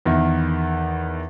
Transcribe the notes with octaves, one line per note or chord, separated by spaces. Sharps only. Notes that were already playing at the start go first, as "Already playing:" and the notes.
E2 D#3 E5